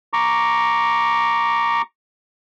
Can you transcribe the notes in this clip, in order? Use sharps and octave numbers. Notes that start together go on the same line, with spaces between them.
A#5 C#6 D6